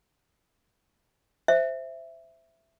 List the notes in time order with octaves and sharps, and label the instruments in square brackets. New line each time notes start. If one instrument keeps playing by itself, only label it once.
[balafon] C5 [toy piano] E5